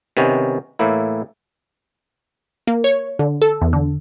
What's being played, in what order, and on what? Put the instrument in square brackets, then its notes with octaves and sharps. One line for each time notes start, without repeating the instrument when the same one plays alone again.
[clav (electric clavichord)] C3 D#3 B3 C#4
A2 E3 A#3 E4
[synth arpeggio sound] A#3
C#5
D3
A4
E2
D3